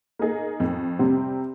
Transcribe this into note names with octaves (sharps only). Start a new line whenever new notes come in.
A#3 D#4 G#4
F2
C3 G3 C4